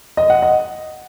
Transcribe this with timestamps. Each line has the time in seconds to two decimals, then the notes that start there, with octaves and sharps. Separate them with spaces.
0.17 D#5
0.30 F#5
0.42 D#5